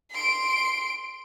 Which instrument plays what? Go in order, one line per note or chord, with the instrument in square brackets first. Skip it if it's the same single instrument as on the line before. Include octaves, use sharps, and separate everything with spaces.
[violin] C6 D7